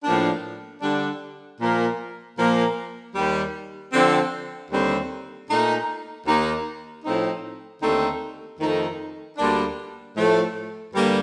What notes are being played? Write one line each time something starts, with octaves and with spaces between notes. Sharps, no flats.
A2 F3 A#3 D4
D3 G3 D4
A#2 F3 A#3
A#2 F3 A#3
D#2 D#3 G3
D3 F3 C4
D#2 D3 G3 C4
A#2 A3 D#4
D#2 D#3 A#3 D#4
A2 F3 C4 D#4
D#2 D3 A3 C4 D#4
F2 D#3 A3 D#4
D2 D3 G3 A#3 D4
A2 F3 A3
G2 D3 G3 A#3